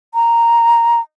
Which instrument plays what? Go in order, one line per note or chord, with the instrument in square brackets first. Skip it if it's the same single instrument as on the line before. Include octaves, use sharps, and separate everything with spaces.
[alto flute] A#5